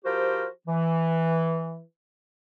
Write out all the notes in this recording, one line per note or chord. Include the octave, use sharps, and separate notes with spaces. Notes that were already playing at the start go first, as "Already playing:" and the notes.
F3 F#4 G4 A#4 C5
E3